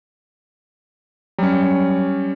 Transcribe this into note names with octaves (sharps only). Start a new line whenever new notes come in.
F#3 G3 C#4